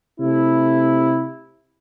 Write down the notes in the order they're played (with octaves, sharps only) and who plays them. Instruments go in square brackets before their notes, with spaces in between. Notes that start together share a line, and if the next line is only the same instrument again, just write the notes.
[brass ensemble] C3 A3 E4